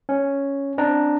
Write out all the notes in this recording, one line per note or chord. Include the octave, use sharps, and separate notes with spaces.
C#4
C4 D4 A#5